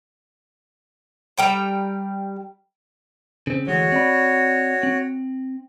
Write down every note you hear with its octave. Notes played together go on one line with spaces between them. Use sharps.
G3 G5 A#5
C#3 C4
D2 E3 G#3 F#4 C#5
C4 D5 B5
C4